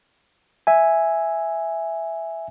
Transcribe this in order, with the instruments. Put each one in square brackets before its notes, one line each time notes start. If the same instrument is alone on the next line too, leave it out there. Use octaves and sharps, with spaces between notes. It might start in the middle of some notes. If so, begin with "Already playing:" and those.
[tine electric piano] E5 G#5